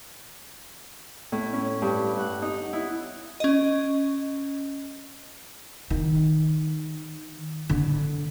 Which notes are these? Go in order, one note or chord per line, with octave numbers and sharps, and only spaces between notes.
A2
C#4
G2
F#5
D#4
E4
C#4 D#5
D#3
D3